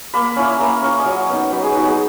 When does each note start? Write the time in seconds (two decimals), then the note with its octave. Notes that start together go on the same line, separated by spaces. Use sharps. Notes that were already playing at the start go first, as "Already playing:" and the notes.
0.14 A#3 B5
0.36 C#4 E4
0.59 A#3 A#5
0.82 C#4 E4 C#5
0.99 D#5
1.05 F#3 C#5
1.29 B3 D#4
1.52 F#3 B4
1.62 G#4
1.75 B3 D#4 F#4
1.86 G#4